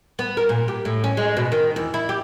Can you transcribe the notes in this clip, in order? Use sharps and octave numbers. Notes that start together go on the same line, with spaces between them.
B3
A#4
A#2
G4
A2
C#4
G#3
B2
D#3
E2
E4
G4